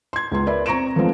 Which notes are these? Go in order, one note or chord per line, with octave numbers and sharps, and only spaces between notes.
C6 G#6
C#2 B3 C6
A#4 B4 D5 E5 B5
C4 A#5 C#6 A#6 D7 E7
F3 G#3 A3 B3 C4 F4